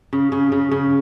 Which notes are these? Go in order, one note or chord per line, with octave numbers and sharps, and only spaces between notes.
C#3
C#3
C#3
C#3